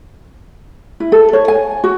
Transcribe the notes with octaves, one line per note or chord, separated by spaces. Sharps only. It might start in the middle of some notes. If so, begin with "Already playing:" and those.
E4
A4
C#5
G#5
F#4